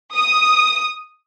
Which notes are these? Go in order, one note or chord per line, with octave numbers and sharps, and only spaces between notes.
D#6